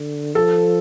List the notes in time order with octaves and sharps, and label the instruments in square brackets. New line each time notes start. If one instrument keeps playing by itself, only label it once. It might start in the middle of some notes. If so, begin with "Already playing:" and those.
Already playing: [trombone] D3
[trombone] F3 [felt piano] A4